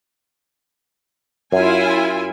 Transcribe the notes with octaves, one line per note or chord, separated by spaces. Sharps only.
F#2 E4 F4 G#5